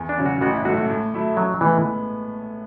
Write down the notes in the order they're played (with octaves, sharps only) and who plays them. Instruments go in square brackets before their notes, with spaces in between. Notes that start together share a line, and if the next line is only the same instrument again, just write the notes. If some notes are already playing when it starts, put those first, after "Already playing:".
Already playing: [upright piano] E2
[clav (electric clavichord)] D4
[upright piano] C#3 F#3 C#4
[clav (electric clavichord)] F#4
[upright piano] A1 [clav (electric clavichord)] F#4
[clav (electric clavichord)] E4
[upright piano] G#2 F#3 A3 [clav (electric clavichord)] F#4
[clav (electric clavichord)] F#4
[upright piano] A2
F#3 A3 E4
[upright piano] A1 [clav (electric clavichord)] F#3
[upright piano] A2 G#3 B3 [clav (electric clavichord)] E3